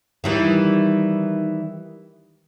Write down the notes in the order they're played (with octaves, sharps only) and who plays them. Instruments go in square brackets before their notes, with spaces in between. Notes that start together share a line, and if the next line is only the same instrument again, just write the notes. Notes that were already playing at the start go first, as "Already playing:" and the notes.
[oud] D#3 E3 G3